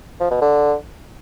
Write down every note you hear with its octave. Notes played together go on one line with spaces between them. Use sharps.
F3
B2
D3